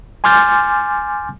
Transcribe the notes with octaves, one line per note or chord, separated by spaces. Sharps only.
G#5 C6 D6 F6 G6 A6